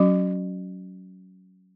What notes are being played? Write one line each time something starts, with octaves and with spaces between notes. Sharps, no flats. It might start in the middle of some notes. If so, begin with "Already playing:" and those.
Already playing: F#3 C#4 F#4